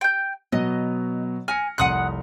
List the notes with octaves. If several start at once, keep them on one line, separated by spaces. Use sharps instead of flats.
G5 G6
B2 F#3 B3 D#5
G#5 F6 A#6 C#7
F1 C2 F#5 C6 D#6 F#6